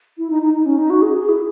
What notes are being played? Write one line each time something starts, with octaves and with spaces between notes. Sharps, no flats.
E4
D#4
D#4
D#4
C#4
D#4
F#4
G#4
G#4
E4